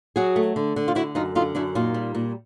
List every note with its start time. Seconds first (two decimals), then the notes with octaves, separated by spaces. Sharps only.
0.16 F#3 F#4 G#4
0.36 A3
0.56 D3
0.76 D3
0.88 F4
0.95 D3 E4 F#4
1.15 F#2 D#4 F4
1.35 D3 D#4 F4
1.55 F#2 D4 E4
1.75 A#2 D#4 F4
1.94 G3
2.15 A#2